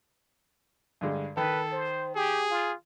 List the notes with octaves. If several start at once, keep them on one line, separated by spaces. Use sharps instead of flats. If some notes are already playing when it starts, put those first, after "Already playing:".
G2 D3 G#3
D#3 A4 B4
C5
G4 G#4
F4